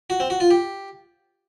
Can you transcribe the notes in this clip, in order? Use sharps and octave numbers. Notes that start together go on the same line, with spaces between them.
F#4
C4
F#4
F4
G4